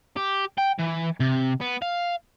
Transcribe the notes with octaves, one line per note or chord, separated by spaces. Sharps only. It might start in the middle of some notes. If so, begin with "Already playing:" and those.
G4
G5
E3
C3
B3
F5